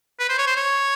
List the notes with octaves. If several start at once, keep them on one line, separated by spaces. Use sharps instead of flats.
B4
C5
C#5
C5
C#5